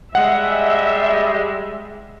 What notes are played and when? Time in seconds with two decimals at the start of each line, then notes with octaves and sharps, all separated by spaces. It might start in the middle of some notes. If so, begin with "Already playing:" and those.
0.15 G3 G#3 E5 F#5